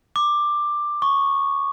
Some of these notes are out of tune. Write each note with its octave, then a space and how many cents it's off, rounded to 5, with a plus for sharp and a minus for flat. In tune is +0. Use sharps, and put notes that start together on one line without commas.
D6 +10
C#6 -5